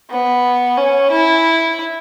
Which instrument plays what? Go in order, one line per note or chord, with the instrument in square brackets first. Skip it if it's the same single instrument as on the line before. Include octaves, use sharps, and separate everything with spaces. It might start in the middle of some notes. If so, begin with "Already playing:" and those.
[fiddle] B3
C#4
E4